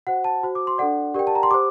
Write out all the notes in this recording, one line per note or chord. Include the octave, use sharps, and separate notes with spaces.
F#4 C5 F#5
A5
F#4 C5
D6
C6
D4 A4 D5 F#5
G4 A#4 D5 G5
A5
A#5
C6
G4 C5 D6